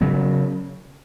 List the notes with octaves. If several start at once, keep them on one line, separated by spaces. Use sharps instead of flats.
C#3 F#3 B3